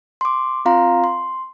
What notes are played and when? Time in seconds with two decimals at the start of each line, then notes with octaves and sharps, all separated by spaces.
0.21 C6 D6
0.65 C4 F4 F5 A#5 C6
1.04 C6